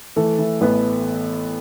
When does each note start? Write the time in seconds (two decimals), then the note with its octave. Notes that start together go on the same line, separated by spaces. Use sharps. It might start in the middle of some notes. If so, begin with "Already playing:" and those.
0.16 E3 A3 A4
0.39 E3
0.61 A1 B3 B4